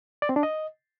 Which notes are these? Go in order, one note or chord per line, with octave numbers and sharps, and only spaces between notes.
D5
C4
D4
D#5